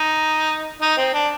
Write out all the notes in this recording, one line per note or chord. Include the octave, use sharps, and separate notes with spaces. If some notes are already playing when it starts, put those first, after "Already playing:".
Already playing: D#4
D#4
C4
D4